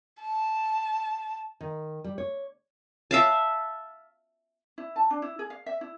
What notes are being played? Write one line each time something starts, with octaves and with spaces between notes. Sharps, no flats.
A5
D#3
G3
C#5
E5 F5 A5
E4
A5
D4
E4
G#4
F5
E5
E4